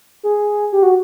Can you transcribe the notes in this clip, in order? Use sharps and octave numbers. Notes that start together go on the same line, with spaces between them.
G#4
G4
F#4